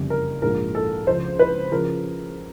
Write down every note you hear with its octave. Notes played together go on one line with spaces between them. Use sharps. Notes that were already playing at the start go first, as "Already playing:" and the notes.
Already playing: F#1 F2 D3 G3
A#4
A#1 G#2 F3 A#4
A4
C#2 C#3 F3 C5
B4
C#3 F3 A#4